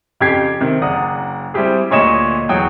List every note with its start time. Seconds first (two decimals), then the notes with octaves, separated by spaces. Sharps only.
0.20 F2 C#3 G4 G5 G#6 C7
0.61 C3 D#3
0.82 F#1 D5 F#5 A#5 D#6
1.54 G3 C4 E4 G4 G#4
1.91 D2 A#2 C#5 D#5 D#6 E7
2.49 E2 F#3 C#5 G5 D#6